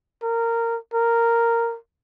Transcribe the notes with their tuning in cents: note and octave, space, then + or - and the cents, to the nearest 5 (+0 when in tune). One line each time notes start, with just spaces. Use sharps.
A#4 -15
A#4 -10